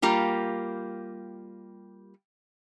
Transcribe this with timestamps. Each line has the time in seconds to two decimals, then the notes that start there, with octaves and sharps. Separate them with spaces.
0.02 G3 A#3 F4 G4